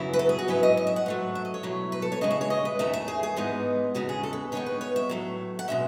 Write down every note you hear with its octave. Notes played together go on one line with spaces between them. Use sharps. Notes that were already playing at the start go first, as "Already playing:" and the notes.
Already playing: F#2 C#3 F#3 B3 E4
B4
A4
G#4
F#4
G#2 F#3 C#4 E4 B4
D#5
D#5
E5
F#5
G#2 F#3 A3
E5
D#5
C#5
B2 F#3 A3 E4
B4
A4
C#5
C#3 E3 G#3 D#5
E5
C#5
D#5
B4
E2 D#3 A3 C#4 E5
E5
G#4
G#4
G#2 E3 G#3 B3 D#4
E2 C#3 G#3 C#4 F#4
G#4
A4
B4
D#3 G#3 B3 D#4 C#5
B4
C#5
E5
A2 F#3 A3
F#5
B2 G#3 C#4 E5